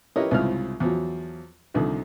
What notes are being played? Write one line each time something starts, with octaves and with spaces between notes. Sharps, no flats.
E4 G4 A#4 B4 C#5 D#5
C2 G#2 C#3 E4 F4 F6
E2 F3 F#3
C2 D3 D#3 F3